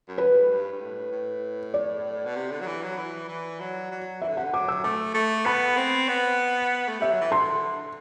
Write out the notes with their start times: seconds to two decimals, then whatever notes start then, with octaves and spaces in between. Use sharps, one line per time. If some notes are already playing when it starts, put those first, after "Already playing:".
0.08 F#2
0.18 B4
0.29 G2
0.41 A2
0.50 G2
0.72 G2
0.80 A2
1.12 A2
1.74 D5
2.25 B2
2.36 C3
2.51 D3
2.61 F#3
2.67 E3
2.83 F#3
2.98 E3
3.29 E3
3.60 F#3
3.92 F#3
4.22 E3 E5
4.29 D3
4.37 C3 F#5
4.45 D3
4.53 F#3 D6
4.68 E6
4.84 A3 D6
5.14 A3
5.46 B3 B5
5.77 C4
6.08 B3
6.88 A3
6.99 G3 E5
7.10 F#3
7.21 E3
7.32 D3 C6